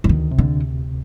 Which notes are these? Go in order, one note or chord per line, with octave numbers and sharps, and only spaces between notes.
F3
D2 D#3
C3
D3